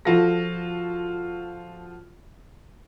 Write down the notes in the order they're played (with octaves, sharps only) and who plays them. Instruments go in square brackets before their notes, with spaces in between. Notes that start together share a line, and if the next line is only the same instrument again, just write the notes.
[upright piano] F3 F4 F#4 A4 A#6